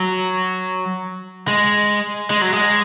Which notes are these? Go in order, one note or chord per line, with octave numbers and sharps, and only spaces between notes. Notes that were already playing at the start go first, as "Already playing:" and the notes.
Already playing: F#3
G#3
G#3
F#3
G#3